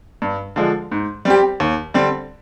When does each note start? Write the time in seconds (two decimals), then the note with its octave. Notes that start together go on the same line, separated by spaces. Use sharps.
0.22 G2
0.56 D3 F3 G#3 D4
0.92 G#2
1.25 G3 C4 G4
1.60 D#2
1.94 D3 G3 C4